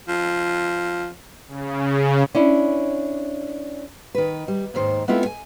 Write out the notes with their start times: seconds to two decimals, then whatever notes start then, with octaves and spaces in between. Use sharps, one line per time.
0.08 F3
1.48 C#3
2.35 C#4 D4 E4 C#5
4.15 D#3 B4
4.48 G3
4.74 D#2 G#2 D#3 C5
5.08 G#3 B3 C4 E4 F4 A4
5.26 G#5